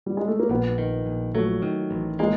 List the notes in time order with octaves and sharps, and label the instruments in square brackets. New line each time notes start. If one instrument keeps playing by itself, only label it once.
[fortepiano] G3
G#3
A3
A#3
[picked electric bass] A#1 [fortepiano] B3
[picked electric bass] D#3
A#1
[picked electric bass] F#3 [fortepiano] A3
[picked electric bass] D#3
A1
[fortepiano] G#3 [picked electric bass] A#3